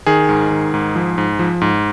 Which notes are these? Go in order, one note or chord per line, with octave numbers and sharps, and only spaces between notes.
D#3 G#4
G#2
D#3
G#2
F3
G#2
F3
G#2